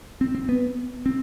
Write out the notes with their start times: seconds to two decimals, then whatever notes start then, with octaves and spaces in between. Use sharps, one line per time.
0.21 C4
0.35 C4
0.49 B3
1.06 C4